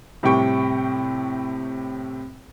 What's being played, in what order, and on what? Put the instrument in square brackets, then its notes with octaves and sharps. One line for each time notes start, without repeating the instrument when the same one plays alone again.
[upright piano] A2 C3 G3 G4 G5 C#6